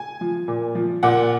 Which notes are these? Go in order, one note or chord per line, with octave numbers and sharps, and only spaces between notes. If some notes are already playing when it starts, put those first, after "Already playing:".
Already playing: G#5
F3
A#2
F3
A#2 F#5